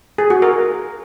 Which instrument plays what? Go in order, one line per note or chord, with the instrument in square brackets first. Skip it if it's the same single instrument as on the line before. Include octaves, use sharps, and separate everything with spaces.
[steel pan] G#4
F#4
A#4